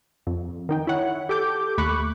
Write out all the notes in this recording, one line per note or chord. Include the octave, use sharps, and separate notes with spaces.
F2
D#3 D#4 G5
E4 C#5 F#5
G4 A4 D6 G6
D#2 A3 B5 C#6 D6 F#6